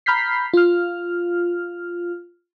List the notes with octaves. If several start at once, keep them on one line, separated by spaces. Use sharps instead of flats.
A#5 B5 F6 G6 B6 C7
F4 F6